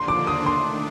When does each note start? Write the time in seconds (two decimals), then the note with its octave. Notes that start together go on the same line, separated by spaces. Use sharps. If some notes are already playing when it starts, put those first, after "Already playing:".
Already playing: D#2 D3 F3 A#3 D4 C6
0.08 D6
0.27 D#6
0.46 D#3 A3 D4 C6